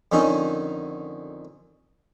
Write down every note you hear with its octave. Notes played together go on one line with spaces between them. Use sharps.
F2 D3 D#3 C#4 D#4